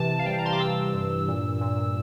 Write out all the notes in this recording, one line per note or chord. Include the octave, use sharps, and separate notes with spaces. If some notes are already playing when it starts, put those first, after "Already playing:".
Already playing: C3 E3 A5
F5
G3 G5
A#5
C6
D6
E3 E6
G2
A#2
A#2